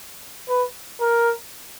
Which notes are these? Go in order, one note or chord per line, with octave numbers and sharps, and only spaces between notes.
B4
A#4